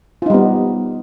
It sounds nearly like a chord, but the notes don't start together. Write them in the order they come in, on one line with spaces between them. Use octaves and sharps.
F4 D#4 G3 B3